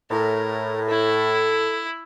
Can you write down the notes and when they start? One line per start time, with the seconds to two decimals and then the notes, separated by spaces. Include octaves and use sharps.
0.10 A2 A#4
0.89 E4 A4